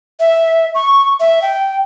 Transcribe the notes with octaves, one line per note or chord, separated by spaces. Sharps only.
E5
C#6
E5
G5